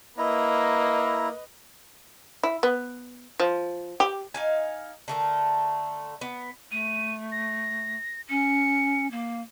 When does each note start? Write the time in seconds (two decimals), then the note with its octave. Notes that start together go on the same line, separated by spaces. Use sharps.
0.18 A#3 E4 B4 D#5 A#5 B5
2.43 E4
2.63 B3
3.40 F3
4.00 G4
4.34 D#4 F5 G#5
5.08 D3 A3 A#4
6.21 B3
6.72 A3 D#7
7.32 A#6
8.29 C#4 C#7
9.11 A#3